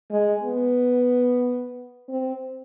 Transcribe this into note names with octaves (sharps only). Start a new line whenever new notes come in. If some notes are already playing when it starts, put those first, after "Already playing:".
G#3
B3
C4